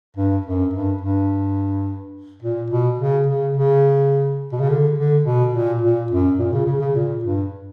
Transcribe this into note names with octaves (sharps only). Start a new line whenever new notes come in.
G2
F#2
G2
G2
A#2
B2
C#3
C#3
C#3
B2
C#3
D3
D3
B2
A#2
A#2
F#2
A#2
C#3
C#3
C#3
A#2
G2